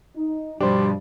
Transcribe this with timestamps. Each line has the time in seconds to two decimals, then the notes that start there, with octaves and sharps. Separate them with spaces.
0.16 D#4
0.61 G2 B2 F3 G3 D4 G4 C5